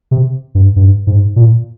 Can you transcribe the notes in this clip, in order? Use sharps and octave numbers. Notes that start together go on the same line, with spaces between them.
C3
G2
G2
G#2
A#2